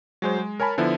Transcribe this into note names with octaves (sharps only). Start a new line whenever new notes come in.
F#3 G#3 C5
G#3
A#4 C#5 G#5 A5 B5
D3 F3 B3 E4